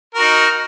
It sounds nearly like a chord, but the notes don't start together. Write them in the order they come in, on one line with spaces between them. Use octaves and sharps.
A#4 F#4 D#4